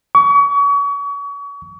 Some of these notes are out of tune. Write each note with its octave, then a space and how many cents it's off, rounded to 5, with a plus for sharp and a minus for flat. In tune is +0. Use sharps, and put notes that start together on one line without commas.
C#6 +35